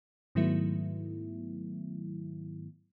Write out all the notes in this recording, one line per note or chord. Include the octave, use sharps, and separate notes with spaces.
G#2 D#3 F#3 A3 B3 E4